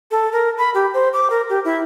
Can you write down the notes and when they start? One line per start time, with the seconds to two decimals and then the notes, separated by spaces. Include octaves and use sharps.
0.11 A4
0.32 A#4
0.58 B5
0.74 G4
0.94 C5
1.13 D6
1.30 A#4
1.50 G4
1.65 E4